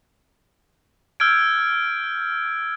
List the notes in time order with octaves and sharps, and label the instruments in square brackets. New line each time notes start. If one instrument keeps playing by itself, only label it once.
[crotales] E6 F6 G6 G#6 D7